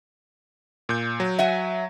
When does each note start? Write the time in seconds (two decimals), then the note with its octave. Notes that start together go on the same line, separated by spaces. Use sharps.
0.89 A#2 G6
1.20 F#3
1.39 E5 F#5 G#5